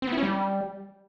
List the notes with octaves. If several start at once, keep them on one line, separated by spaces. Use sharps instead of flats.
C4
B3
E4
C#4
G3